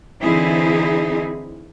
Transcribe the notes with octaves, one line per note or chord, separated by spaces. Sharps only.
D3 E3 C4 D#4 E4 G#4